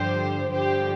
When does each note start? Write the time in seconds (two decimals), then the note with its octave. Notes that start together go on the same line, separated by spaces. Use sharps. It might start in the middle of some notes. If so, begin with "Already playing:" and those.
Already playing: G2 D3 F3 G4 C5
0.50 G2 D3 F3 G4 C5